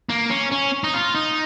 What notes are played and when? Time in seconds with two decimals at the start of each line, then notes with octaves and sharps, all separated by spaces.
0.09 A#3
0.30 C#4
0.52 C#4
0.84 D#4
0.94 F4
1.15 D#4